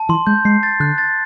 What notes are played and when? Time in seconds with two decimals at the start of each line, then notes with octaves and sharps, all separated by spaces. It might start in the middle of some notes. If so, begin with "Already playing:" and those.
Already playing: A5
0.09 E3 C6
0.27 G#3 G6
0.45 G#3 C7
0.63 A6
0.80 D3 F#6
0.98 A6